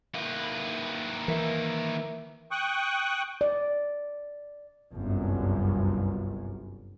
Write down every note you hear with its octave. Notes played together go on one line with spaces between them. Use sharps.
D#3 A#3 E4 B4
E3 A#4 E5
G5 C#6 D#6 F#6
D5
G1 C2 F#2